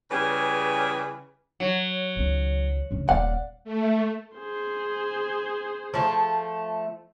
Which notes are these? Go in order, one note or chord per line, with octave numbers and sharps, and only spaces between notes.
C#3 E3 G3 C#4 G#4 B4
F#3
C#2 D#3
D2 C#3
D#1 D5 F5 F#5
A3
G#4 C5
F3 A3